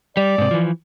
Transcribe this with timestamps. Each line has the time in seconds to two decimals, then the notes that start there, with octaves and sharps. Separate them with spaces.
0.17 G3 D5
0.38 G#2 C3
0.51 E3 F3